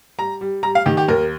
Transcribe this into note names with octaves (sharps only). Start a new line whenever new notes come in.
G3 A#5
G3
G3 A#5
F5
D#3 G4
G4
D#2 A#4